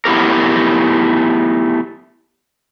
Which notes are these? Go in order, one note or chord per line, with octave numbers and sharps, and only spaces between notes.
A3 B3 E4 G4 A#4